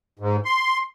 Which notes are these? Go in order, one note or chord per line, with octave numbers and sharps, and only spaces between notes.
G#2
C6